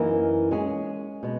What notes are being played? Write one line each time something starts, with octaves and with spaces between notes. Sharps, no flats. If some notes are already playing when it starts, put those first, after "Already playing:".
Already playing: F#2 E3 A#3 D#4 A#4
G#3 C#4 G#4
B2 G#3